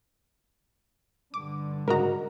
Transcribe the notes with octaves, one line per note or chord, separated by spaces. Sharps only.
G2 D3 D6
G#2 C#3 F#4 A#4 D#5 A#5